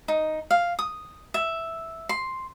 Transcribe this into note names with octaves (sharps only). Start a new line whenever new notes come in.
D#4
F5
D#6
E5
C6